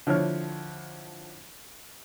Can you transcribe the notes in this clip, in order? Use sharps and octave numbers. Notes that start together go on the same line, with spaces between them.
D3 F3 E4 C#5 F6